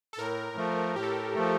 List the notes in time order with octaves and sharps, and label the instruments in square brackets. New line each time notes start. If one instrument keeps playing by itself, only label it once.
[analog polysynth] A4
[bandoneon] A2 [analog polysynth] A#4
[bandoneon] F3 A3
[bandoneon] A2 [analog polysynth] G4
[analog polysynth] A4
G4
[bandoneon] F3 A3